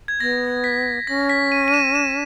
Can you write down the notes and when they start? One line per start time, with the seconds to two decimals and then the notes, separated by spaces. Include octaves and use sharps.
0.08 G#6
0.20 B3 A#6
0.64 B6
1.07 C#4 A#6
1.29 B6
1.52 D#7
1.68 D#7
1.74 E7
1.95 E7